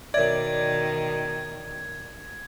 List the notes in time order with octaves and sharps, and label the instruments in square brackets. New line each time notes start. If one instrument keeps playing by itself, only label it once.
[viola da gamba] B2 D#3 [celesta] A#4 C#5 E5 [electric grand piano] D5 [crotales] G#6